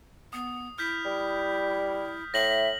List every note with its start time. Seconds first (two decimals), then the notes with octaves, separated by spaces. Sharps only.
0.33 B3 D#6
0.78 E4 F6 G6 B6
1.05 G3
2.34 A2 E5 A#6 F#7